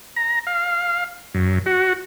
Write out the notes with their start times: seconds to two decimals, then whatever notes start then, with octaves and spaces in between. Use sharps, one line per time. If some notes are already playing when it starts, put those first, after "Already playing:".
0.16 A#5
0.47 F5
1.34 F#2
1.66 F#4